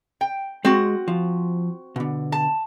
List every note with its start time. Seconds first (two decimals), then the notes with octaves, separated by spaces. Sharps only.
0.21 G5
0.65 G#3 C4 F#4
1.08 F3
1.96 B2 D3
2.32 A5